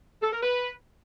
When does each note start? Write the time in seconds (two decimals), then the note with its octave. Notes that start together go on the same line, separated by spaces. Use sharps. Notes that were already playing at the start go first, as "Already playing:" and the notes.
0.22 A4
0.32 A#4
0.42 B4